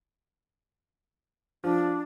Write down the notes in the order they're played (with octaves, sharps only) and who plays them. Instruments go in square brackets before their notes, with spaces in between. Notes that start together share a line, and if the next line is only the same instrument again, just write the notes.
[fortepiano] F3 [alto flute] D4